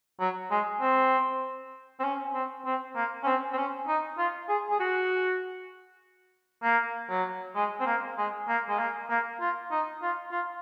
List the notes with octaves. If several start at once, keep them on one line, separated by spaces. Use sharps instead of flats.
F#3
G#3
C4
C4
C#4
C4
C4
A#3
C#4
C4
C4
C#4
D#4
F4
G#4
G#4
F#4
A#3
F#3
G#3
C4
A#3
G#3
A#3
G#3
A#3
A#3
F4
D#4
F4
F4